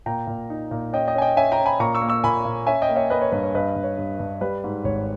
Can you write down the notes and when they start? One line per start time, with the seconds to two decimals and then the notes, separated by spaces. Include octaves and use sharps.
0.06 A#2 G5 A#5
0.27 A#2
0.50 D#4
0.71 A#2
0.93 C#4 D#5 G5
1.07 D#5 G5
1.15 C#4 G#5
1.22 D#5 G5
1.36 C#4 E5 G#5
1.52 G5 A#5
1.58 C#4
1.66 G#5 B5
1.80 A#2 A#5 C#6
1.95 C#6 E6
2.01 A#3
2.09 C#6 E6
2.24 A#2 G#5 B5
2.45 A#2
2.67 C#4 E5 G#5
2.82 D#5 G5
2.88 A#3
2.96 C#5 E5
3.10 A#3 B4 D#5
3.22 C#5
3.32 G2 B4
3.43 C#5
3.54 G2 B4 D#5
3.76 G2
3.83 C#5
3.98 G2
4.19 G2
4.41 G3 B4
4.64 G#2
4.84 G#1 C#5